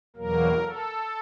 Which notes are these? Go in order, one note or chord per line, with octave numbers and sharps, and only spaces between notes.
E2 B2 F#3 A#3 A#4
A4